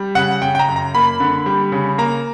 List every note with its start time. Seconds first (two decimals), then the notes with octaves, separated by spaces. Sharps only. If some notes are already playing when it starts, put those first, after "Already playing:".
Already playing: G3
0.15 C#3 F#5
0.42 C#3 G5
0.55 G5
0.59 A#5
0.68 F#2
0.76 A#5
0.94 A#3 B5
1.20 D3
1.46 G3
1.72 C#3
1.98 A#3 A#5